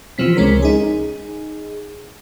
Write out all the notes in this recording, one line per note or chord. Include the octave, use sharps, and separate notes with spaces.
C3 E3 F3 C4 B6
C#2 G#3 C#4 A#4 B6
D#4 G#4